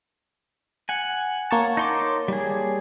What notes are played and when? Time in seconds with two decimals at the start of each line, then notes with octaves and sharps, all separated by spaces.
0.89 F#5 G#5
1.51 A#3 C#5 A5
1.77 D#4 C6 D6
2.28 G3 G#4